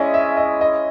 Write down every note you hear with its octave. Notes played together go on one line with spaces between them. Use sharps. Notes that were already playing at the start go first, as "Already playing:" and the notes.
Already playing: G#3 C#4 E4 G#4 D5 D#5
E5
D#5
D#5